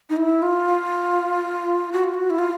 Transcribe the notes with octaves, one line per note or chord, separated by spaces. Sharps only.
D#4
E4
F4
F#4
F4
F#4
E4
F4